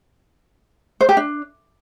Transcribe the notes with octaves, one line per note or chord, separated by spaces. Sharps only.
C5
G4
D4